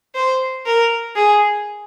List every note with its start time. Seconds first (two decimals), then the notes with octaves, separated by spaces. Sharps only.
0.15 C5
0.65 A#4
1.16 G#4